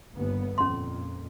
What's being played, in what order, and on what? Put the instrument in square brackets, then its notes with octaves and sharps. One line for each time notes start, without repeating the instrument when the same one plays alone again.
[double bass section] G1 D#2 B3
[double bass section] F2 A#2 [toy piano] C#4 C6